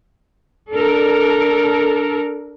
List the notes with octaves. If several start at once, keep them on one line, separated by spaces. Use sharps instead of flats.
D4 A4 A#4